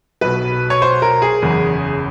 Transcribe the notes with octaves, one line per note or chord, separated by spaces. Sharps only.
B1 B2 B4
C#5
C5
A#4
G#4
F#1 E2 C#3